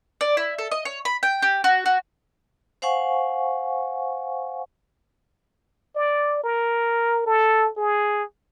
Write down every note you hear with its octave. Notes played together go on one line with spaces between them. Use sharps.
D5
E4
A4
D#5
C#5
B5
G5
G4
F#4
F#4
C5 F5 F#5 G#5 C#6
D5
A#4
A4
G#4